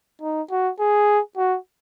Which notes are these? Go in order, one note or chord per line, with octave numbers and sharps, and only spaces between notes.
D#4
F#4
G#4
F#4